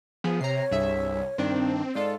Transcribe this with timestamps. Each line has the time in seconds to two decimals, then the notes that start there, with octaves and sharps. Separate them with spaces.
0.24 F3 B3 G#4
0.41 C3 C#5 A#5 C7
0.71 C2 G2 G#4 E5
1.38 G2 D#3 C4 D4
1.95 G#2 F4 A4 D5